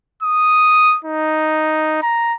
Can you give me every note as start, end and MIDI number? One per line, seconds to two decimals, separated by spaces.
0.23 0.98 87
1.04 2.00 63
2.02 2.35 82